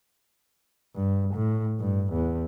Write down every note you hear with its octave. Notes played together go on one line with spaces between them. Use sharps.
G2
A2
G2
E2